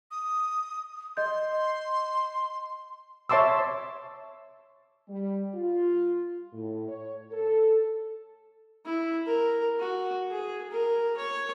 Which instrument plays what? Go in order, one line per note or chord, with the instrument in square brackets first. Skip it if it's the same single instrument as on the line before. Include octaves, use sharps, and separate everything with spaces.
[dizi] D#6
[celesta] D#5 G6 [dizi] C6
[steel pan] C#5 E5 A5 C6 D6 E6
[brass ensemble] G3
F4
A2
C#5
A4
[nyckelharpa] E4
A#4
F#4
G#4
A#4
C#5